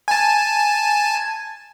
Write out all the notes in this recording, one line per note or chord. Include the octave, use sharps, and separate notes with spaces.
G#5 A5